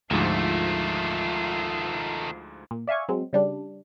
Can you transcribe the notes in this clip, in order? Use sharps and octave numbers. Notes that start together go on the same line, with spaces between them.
D2 G#2 D#3 F3 A3 F4
A#2
D5 E5 F5 G#5 C#6
F#3 G#3 C4
C#3 G3 D4